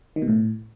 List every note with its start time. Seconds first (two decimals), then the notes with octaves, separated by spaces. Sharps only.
0.16 D#3
0.22 B2
0.28 A2